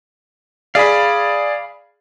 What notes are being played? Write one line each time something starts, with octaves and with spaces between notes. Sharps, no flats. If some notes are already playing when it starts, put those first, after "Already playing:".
G#4 D5 F5 B5